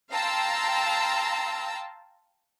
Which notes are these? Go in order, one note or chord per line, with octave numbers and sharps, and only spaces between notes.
F5 G5 A5 A#5 C6 E6